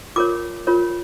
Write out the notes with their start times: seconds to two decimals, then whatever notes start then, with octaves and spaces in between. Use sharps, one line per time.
0.16 F4 A#4 C#5 D6
0.67 F4 A#4 C#5